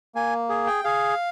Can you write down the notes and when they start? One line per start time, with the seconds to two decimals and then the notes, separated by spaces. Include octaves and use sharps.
0.15 A#3 G#5
0.49 G#4
0.67 G5
0.84 G#4 F5